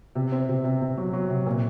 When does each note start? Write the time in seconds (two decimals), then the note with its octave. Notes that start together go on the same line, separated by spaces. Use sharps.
0.15 C3
0.32 C4
0.49 C3
0.64 C3
0.82 C3
0.97 F#3
1.13 F#3
1.30 C3
1.46 A#2